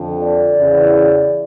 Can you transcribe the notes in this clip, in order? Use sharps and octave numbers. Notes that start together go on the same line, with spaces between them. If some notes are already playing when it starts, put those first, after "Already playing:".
Already playing: F2 D3
D5
E2 C#3 E3